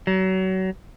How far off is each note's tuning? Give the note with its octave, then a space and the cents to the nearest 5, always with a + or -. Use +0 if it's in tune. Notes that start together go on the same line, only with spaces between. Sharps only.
F#3 +30